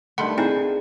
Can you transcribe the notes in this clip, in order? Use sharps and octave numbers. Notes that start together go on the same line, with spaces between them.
G2 D#3 A3 F#5 B5 C6
C4 D#4 E4 G#4 C5